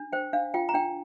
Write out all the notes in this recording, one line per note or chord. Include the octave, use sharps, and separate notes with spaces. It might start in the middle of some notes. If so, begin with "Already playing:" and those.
Already playing: D4
C5 G5
D4 F5
F4 G5
A#5
D4 G5